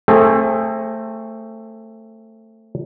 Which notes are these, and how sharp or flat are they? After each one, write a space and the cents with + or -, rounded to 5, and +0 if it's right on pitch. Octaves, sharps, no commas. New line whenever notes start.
A3 +15 C4 +25 G#4 +0